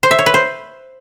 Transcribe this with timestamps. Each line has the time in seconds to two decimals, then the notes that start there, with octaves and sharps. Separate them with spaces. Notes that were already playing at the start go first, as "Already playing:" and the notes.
0.03 C5
0.11 E5
0.19 C#5
0.26 B4
0.34 C5